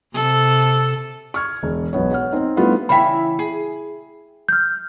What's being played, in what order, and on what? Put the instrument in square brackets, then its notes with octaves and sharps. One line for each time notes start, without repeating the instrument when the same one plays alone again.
[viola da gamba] C3 A4
[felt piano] C#6 F6 G#6
E1
B1 B3 C#5
C#5 F#5 F6
C4 D#4
G3 A3 B3 D4 E4 F4
[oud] C#3 E3 E5 [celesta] G5 B5
[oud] G#4
[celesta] F6 G6